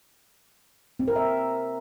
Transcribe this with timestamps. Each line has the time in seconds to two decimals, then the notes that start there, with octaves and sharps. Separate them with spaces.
0.99 C4
1.08 A#4
1.16 E5